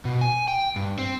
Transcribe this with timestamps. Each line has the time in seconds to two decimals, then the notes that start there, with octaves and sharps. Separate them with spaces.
0.05 B2
0.21 G#5
0.48 G5
0.76 G2
0.99 C4